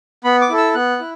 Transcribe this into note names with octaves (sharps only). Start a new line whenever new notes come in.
B3 B5
D6
E4 A4
E6
B3 F#6
E4